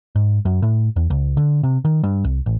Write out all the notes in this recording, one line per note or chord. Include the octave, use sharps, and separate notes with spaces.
G#2
F#2
A2
E2
C#2
D3
C3
D#3
G2
C2
A1